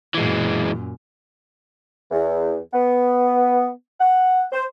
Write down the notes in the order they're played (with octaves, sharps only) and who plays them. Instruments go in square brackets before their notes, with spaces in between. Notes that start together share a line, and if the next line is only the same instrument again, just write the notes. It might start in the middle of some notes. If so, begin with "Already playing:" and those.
[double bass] F#2 A#2 [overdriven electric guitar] E3 G#3
[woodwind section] E2
B3
F#5
C5